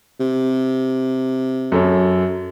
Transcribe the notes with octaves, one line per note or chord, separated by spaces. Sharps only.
C3
F#2 A4 C#5